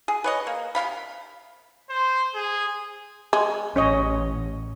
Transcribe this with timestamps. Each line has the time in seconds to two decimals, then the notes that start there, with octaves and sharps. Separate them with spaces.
0.08 G#4
0.24 B4 C#5 D#5
0.47 A#3
0.75 C3 F4 F5 B5
1.89 C5
2.35 G#4
3.33 G#3
3.76 A1 A2 C#4 C#5 D#5